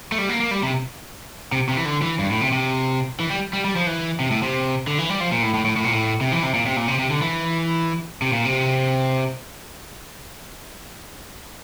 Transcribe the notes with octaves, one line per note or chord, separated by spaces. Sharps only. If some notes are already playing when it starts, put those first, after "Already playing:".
A3
G3
A#3
A#3
G3
C3
C3
C3
E3
D3
E3
G2
A2
C3
C3
E3
G3
G3
G3
F3
E3
C3
A2
C3
D3
E3
G3
F3
A#2
A2
A2
A2
A2
A#2
A2
C3
E3
C3
A#2
C3
A#2
C3
C3
D3
E3
C3
A#2
C3